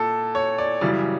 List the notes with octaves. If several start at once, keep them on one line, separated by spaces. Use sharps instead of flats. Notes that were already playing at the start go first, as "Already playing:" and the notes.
Already playing: A#2 A4
C#5
D5
F#2 C#3 E3 G3 D5